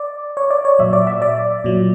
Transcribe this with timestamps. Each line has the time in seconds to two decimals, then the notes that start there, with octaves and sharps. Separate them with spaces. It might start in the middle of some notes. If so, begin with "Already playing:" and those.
Already playing: D5
0.37 C#5
0.50 D5
0.65 C#5
0.79 A#2 F#3 E5
0.93 D5
1.07 E5
1.22 D5
1.64 A#2 F#3